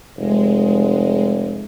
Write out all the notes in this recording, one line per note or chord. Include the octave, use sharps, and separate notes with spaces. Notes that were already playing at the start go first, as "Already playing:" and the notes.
F1 G#3